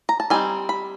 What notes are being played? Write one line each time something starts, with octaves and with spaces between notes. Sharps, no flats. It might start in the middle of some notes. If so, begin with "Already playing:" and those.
A#5
A5
G3 C4 D#4 G#5
B5